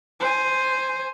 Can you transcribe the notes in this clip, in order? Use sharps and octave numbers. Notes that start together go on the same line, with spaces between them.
C5 G#5